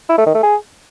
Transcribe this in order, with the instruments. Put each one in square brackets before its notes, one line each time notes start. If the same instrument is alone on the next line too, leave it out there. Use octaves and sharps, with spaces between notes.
[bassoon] E4
A3
D#3
A3
G#4